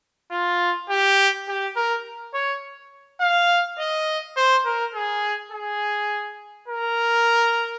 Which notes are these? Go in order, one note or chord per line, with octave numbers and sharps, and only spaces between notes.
F4
G4
G4
A#4
C#5
F5
D#5
C5
A#4
G#4
G#4
A#4